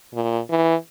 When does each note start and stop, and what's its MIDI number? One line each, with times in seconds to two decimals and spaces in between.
0.14 0.39 46
0.50 0.75 52